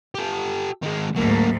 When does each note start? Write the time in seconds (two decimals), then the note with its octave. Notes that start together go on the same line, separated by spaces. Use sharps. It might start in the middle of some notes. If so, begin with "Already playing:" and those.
0.15 G4 A4
0.83 D#3 G#3
1.16 D2 G#2 F#3 A#3